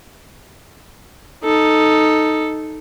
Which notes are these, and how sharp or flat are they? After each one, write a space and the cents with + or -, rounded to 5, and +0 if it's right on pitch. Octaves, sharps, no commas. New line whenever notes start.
D#4 +0 A4 +0